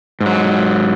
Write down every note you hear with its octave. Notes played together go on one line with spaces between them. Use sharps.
G#2
F#3